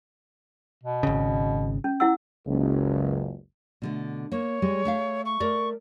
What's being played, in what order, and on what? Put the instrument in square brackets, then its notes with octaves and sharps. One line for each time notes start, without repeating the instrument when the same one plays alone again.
[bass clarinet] B2
[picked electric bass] G#1 C#3
[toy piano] C#4
E4 F#5 E6
[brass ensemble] F#1 C#2
[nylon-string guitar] B2 D3 A3
[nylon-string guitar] A#3 [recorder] C#5
[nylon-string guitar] G3 G#3
A3 E5 F5
[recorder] C#6
[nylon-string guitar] A3 A#4 D5